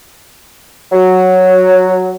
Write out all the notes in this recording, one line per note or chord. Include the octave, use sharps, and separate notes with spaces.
F#3